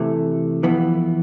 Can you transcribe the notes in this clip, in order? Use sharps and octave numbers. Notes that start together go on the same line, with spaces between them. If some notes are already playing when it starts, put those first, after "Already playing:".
Already playing: C3 E3 A3
F2 E3 B3